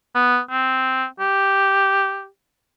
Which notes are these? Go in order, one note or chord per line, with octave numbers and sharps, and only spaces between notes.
B3
C4
G4